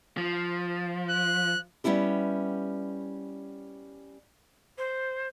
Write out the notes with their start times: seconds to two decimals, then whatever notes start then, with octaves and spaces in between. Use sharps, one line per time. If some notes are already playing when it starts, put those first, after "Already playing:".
0.17 F3
1.10 F#6
1.84 G3 B3 C#4 E4 G4
4.78 C5